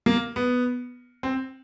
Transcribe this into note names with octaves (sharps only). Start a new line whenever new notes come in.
A#3
B3
C4